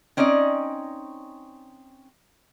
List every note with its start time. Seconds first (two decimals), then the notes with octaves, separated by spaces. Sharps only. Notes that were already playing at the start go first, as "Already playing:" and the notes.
0.17 C4 C#4 D#4 D5 D#5